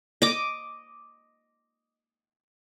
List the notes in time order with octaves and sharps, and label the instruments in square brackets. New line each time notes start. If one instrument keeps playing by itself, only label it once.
[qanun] D#5 D6